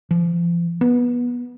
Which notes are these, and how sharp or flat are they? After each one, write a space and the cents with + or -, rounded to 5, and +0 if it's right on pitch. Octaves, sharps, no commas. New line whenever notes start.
F3 -35
B3 -20